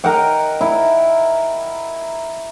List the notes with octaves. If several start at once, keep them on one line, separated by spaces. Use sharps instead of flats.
A#4 D#5 F#5 G5
E4